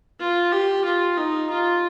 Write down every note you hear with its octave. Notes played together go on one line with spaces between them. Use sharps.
F4
G4
F4
D#4
F4